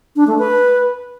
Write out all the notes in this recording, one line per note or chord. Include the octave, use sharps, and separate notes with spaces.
D4
A3
B4